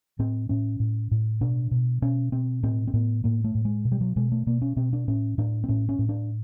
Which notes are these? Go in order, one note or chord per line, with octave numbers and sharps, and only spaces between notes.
A2 C4
A2 C#4
A2
A2
B2 D4
B2
B2 C#4
B2 C4
A2 C4
C4
A2 B3
A2 A#3
A3
A2
G#3
B2
G3
F#3
B2 G#3
A3
B2 A#3
C#4
B2 C4
D4
A2 C#4
A2 D4
C4
A2 C#4
C#4
A2
D4